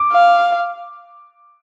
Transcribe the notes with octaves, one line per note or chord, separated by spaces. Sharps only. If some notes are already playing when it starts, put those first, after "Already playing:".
Already playing: D6
F5